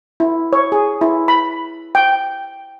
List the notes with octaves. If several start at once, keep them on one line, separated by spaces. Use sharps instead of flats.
E4
C#5
G#4
E4
B5
G5